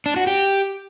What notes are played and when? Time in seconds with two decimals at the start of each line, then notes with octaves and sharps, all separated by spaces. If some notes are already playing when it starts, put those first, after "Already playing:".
0.06 D4
0.16 F#4
0.27 G4